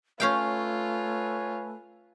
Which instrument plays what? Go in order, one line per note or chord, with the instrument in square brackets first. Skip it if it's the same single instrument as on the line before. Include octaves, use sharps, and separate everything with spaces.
[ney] A3 [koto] C#4 F5 G5 [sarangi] F4 [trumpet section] B4 C#5 G#5